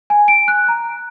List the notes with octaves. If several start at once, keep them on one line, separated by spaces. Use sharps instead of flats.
G#5
D7
F#6
A#5